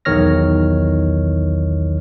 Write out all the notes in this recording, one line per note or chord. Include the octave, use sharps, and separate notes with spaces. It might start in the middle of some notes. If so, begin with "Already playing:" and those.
B1 E2 D#3 C#5 F6 A#6